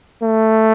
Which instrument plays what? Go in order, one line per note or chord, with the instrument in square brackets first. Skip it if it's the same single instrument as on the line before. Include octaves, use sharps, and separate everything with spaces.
[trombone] A3